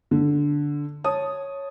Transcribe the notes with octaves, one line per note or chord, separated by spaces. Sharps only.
D3
C#5 A5 D#6